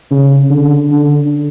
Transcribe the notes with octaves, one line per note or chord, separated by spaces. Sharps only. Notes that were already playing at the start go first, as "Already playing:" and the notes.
C#3
D3
D3